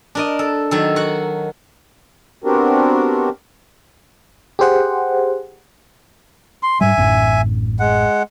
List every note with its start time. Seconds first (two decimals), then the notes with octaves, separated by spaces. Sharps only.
0.15 D4 A#4 D#5
0.39 A4
0.71 D#3 F#3 A4
0.96 F#4 F#5
2.44 B3 C4 D4 F#4 G4 A#4
4.59 G4 G#4 C5 F#5
6.63 C6
6.81 G#2 G3 E5 G#5
6.97 A1 F#2 A2
7.80 G#3 F#5